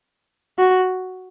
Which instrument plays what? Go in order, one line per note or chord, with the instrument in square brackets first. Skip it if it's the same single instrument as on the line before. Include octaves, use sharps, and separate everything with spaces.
[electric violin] F#4